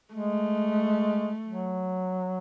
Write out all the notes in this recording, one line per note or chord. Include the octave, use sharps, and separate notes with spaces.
G#3 A3
F#3